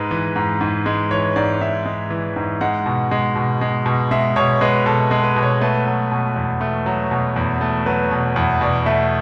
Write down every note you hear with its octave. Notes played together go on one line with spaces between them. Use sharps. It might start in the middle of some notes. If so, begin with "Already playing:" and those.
Already playing: G#2 G#3 B4
E3
G#2
G#2
G#3
E3 C#5
G#2 D5
G#2 E5
G#3
E3
G#2
G#3 F#5
B2
G#3
B2
G#3
B2
G#3 E5
B2 C#5
G#3 B4
B2 A4
G#3
B4
B2
C#5
A3 B4
F#3
B2
E2
A3
F#3
B2
E2
A3
F#3 B4
B2
E2
B2 D5
A3 E5